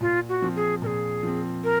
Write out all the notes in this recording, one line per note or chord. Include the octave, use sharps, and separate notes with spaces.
A#2 F4
F#4
F3 C4
G#4
A#2 G#4 A#4
F3 C4
A#4